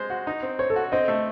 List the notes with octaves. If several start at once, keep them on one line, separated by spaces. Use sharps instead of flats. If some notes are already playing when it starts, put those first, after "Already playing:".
Already playing: G#3 C4 C5
F#4
D#4
C4
C5 C#5
A4
F#4
C4 D#5
A3